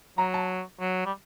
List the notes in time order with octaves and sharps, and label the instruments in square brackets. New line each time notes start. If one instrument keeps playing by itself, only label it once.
[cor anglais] F#3 [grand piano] A#5
[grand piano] A5
[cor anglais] F#3
G3